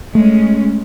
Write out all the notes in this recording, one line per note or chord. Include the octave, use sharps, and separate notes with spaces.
G#3 A3 C#4